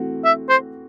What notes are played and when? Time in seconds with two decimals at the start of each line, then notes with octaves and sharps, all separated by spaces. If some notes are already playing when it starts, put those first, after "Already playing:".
Already playing: E3 A3 C4 F#4
0.25 E5
0.49 C5